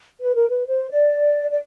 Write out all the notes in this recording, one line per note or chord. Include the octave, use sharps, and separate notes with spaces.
B4
A#4
B4
C5
D5
D5